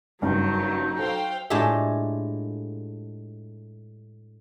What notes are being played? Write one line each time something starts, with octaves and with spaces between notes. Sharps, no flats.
F#1 G2 F#3 D#4
A4 C5 F5 G5
A2 G#3 D4 F4 G4 E5